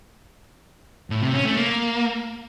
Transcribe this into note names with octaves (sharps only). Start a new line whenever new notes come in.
A2
C3
C#4
A3
A#3